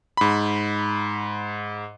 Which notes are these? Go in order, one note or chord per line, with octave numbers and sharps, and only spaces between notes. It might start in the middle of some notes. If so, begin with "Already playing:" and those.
G#2 B5